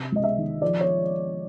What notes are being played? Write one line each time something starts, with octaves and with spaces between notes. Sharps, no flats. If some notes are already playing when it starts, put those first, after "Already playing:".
Already playing: C3
C#2 D#5
E5
D#3
F3 D5
C#5